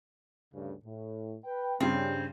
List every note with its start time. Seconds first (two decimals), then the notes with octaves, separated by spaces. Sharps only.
0.53 D2 G2 C#3
0.84 A2
1.44 B4 G5
1.80 G2 C#3 G3 C4 C#4